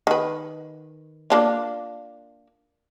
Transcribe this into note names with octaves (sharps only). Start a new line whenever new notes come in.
D#3 B4
A#3 D4 F4